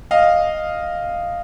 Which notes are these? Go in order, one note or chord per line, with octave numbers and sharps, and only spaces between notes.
D#5 F5